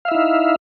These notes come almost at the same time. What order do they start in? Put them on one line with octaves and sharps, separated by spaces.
F5 E5 E4 D#4